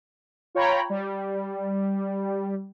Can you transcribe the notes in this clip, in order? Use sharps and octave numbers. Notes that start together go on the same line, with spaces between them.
F4 C#5 G5 A#5 B5
G3